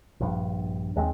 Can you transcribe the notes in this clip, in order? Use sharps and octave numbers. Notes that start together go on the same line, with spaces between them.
A#1 G2
D#2 G#3 B3 C4